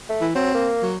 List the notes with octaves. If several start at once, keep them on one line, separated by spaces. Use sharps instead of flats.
A3
E3
F#3 C4
A#3
F#3